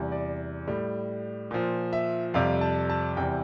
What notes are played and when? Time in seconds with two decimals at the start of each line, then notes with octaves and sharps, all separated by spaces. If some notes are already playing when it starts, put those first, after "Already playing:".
Already playing: E2 C3 G3
0.12 D5
0.67 A2 G3
1.51 A#2 F3
1.93 E5
2.34 F2 C3 G3 F5
2.61 A5
2.90 A5
3.17 E2 C3 G3 G5